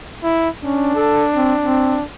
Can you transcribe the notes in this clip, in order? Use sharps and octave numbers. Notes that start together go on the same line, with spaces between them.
E4
C#4 D4
A4
C4
C4